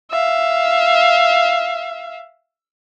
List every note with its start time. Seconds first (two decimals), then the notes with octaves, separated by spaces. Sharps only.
0.11 E5 F5